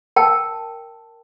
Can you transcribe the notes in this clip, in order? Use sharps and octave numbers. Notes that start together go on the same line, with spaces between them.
A#4 G5 A5